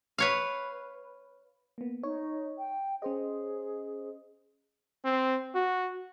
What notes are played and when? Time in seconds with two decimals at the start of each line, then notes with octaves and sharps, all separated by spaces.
0.18 B4 C#5 F5
1.78 A#3 B3
2.03 D#4 C#5
2.58 G5
3.02 C#4 G#4 C5 D#5
5.05 C4
5.55 F#4